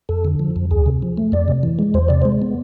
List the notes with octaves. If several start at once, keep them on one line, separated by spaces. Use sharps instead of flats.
F2 A4
D3
F3
F2
D2 G#4
C3
F3
A3
F2 D5
C3
E3
G#3
E2 C5
C3 D5
G#3 C5
B3